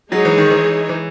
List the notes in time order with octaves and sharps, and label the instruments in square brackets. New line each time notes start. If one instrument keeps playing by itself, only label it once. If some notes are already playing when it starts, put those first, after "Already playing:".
[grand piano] F#3 [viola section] G#3 D#4 G#4 C#5
[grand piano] E3
D#3
E3
E3